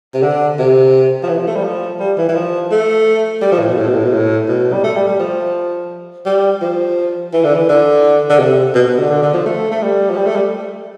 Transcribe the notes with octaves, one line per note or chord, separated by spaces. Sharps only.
C3
D3
C3
F3
E3
F3
A3
G3
F3
G3
E3
E3
F3
A3
G3
F3
A2
B2
A2
B2
A2
B2
A2
B2
G3
A3
G3
G3
F3
G3
F3
E3
D3
E3
D3
D3
C3
B2
B2
D3
D3
D3
F3
A3
A3
G3
F3
G3
A3
G3